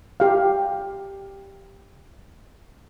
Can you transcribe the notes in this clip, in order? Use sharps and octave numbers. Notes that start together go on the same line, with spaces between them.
G4 F5